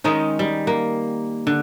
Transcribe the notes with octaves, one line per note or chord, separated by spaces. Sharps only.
D#3 G#3 C#4 D#4
G3
A#3
D3